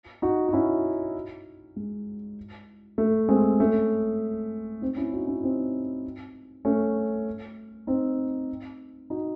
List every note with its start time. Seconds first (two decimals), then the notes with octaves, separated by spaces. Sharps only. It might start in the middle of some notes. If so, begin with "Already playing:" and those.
0.22 D#4 F#4
0.49 F#4
0.53 C#4 E4
1.76 G#3
2.98 A3
3.29 G#3 C4
3.60 A3 C#4
4.81 C4 D#4
4.96 C#4 E4
5.13 D#4 F#4
5.27 C#4 E4
5.43 C4 D#4
6.65 A3 C#4
7.87 C4 D#4
9.10 D#4 F#4